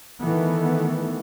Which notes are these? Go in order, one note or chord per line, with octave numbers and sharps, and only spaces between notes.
D#3 E3 A3 B3